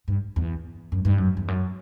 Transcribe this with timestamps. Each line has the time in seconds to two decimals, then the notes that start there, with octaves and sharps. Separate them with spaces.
0.08 G2
0.36 E2
0.92 F#2
1.05 G2
1.18 F#2
1.37 E2
1.48 F#2